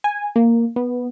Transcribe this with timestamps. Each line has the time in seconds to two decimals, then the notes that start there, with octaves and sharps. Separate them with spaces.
0.04 G#5
0.36 A#3
0.76 B3